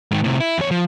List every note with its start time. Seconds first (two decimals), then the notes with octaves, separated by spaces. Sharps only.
0.11 G#2 D#3
0.24 A2 C3
0.40 E4
0.58 E2 C#5
0.71 F3